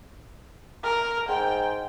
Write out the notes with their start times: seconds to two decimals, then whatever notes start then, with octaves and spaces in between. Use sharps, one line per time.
0.83 A#4
1.28 G#2 G5